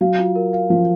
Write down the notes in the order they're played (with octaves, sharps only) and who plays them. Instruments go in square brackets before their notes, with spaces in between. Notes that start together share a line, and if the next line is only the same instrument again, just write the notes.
[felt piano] F#3 [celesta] F5
[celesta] F4
A#4
F5
[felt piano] F3 [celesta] F5